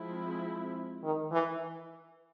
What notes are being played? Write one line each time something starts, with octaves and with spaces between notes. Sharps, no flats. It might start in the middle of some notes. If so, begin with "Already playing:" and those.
Already playing: F3 G#3 C4 E4
D#3
E3